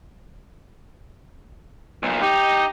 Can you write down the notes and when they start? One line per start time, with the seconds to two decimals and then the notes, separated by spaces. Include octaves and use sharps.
2.03 B1 A#2
2.22 D#4 G4